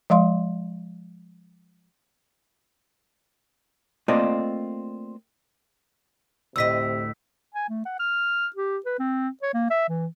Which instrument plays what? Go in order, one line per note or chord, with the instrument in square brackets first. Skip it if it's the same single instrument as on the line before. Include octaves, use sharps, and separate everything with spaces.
[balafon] F3 G#3 F5 C6
[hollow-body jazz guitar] A3 A#3 C4 F4 D5 D#5
[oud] D2 A2 D#5 [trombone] C3 [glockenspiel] E6 B6
[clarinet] G#5
A3
F#5
F6
G4
B4
C4
C#5
A#3
E5
E3